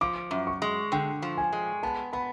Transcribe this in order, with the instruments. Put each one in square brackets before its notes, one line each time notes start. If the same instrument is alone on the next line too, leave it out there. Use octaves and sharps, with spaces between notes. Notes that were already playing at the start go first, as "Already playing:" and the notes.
[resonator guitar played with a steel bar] F3 [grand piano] D6
[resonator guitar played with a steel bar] F#2
[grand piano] C#6
[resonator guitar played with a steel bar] G#3
[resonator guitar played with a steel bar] D3 [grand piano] G5
[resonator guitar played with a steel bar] F3
[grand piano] G#5
[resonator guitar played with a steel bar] G#3
[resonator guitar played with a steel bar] B3 [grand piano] A5
[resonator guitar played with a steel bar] B3 [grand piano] B5